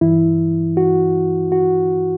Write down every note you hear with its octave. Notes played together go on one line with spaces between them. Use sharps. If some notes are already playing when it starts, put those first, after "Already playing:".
G2 E3 E4
F#4
F#4